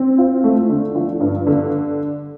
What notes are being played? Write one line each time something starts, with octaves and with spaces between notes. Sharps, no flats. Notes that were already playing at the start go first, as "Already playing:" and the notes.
Already playing: C4
F4
A3
D3
F3
G2
D3